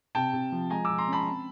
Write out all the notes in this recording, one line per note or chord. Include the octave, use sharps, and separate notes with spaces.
C3 G5 A5
C3
F3
G#3 G#5 A#5
F3 D6 E6
A#5 C6
C#4 A5 B5
C4